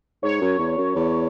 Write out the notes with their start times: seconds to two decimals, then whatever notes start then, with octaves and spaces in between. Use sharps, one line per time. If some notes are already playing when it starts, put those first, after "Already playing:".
0.23 G#2 C#5
0.41 F#2
0.59 E2
0.78 F#2
0.96 E2